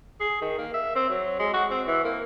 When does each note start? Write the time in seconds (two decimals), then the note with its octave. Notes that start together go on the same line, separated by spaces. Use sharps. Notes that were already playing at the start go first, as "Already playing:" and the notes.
0.20 G#4
0.42 D#3
0.58 A#3
0.74 E5
0.95 C4
1.10 F#3
1.39 G#3
1.53 F#4
1.71 C4
1.87 E3
2.05 A#3